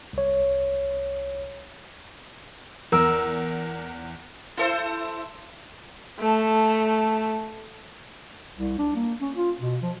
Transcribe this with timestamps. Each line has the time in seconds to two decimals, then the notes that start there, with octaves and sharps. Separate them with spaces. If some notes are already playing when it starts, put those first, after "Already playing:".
0.13 C2 C#5
2.92 E2 A#4 E6
4.57 E4 A4 C5
6.19 A3 A5
8.55 C2
8.78 D4
8.95 A#3
9.21 C#4
9.35 F4
9.60 B2
9.82 F3